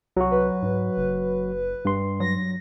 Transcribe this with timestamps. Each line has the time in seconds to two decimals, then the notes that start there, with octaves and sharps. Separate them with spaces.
0.17 C2 F#3 F#4
0.31 B4
0.62 G#2
0.97 F#1
1.85 G2 C6
2.20 F#3 A#6